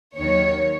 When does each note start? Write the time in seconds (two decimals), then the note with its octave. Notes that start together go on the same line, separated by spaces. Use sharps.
0.16 D#2 D#3 F#3 C#5